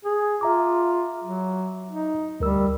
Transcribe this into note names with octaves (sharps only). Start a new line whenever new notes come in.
G#4
F4 E5 A#5 D6
F#3
D#4
D2 G3 A#4 E6